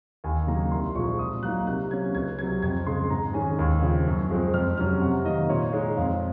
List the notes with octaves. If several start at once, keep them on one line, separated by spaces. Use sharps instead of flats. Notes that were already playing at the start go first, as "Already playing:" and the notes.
D#2 G#5
C#3 F#3 A#3 D#4 A#5
C2 C6
A#2 F3 G#3 C#6
A#2 D#6
F#3 A#3 D#4 F#6
C3 F#6
F#3 A#3 C#4 G#6
C#2 G#6
C3 F#3 G#6
F2 G#6
C#3 G#3 C6
G#2 A#5
D#3 G#3 C#4 G#5
D#2
C#3 F3
F#2
F3 G#3 C4
F2 F6
C3 F#3 C#4 F6
C3 F#5
D#3 A#3 D#5
A#2 C#5
G#3 D#4 C#5
F2 F5